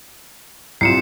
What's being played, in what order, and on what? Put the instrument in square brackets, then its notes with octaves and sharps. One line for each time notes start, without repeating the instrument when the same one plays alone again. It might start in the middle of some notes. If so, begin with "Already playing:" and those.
[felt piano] C2 F4 [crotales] C7 C#7 E7